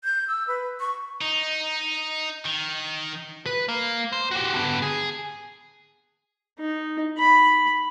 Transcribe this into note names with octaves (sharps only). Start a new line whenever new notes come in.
G6
E6
B4
C#6
D#4
D#3
B4
A#3
C5
F#4 G4
D3 B3
G#4
D#4
B5